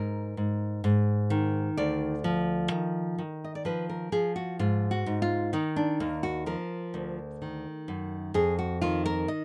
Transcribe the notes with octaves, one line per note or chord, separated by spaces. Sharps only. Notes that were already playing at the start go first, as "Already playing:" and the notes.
Already playing: G#2 A#4
G#2
G#2
D#3
D2 D5
F3
D#3
D#3
D#5
D5
F3 B4
A#4
F3 G#4
F#4
G#2 F4
F#4
G#2
F4
D#3 D#4
D4
D#2 A#3
F#4
F3 A#4
D2
D#3
F#2
F2 G#4
F#4
D#3 F4
A#4
D#5